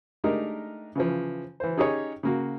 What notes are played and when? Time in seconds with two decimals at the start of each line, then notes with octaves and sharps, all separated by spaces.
0.24 G#3 A3 D4 D#4 G4 A#4
0.96 C#3 E3 F3
1.60 E3 C5
1.78 C#4 D#4 G4 G#4 C#5
2.23 C#3 A#3 F#4